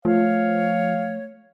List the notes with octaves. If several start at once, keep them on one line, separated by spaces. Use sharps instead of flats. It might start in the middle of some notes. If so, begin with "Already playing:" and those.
F3 A3 C#5 F5